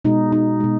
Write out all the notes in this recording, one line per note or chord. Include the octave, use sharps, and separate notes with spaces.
B2 G#3 D#4
D#4
B2 G#3